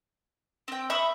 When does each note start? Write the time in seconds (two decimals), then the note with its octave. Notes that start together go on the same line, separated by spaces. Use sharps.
0.68 C4 G5
0.90 E5 B5 C#6 D#6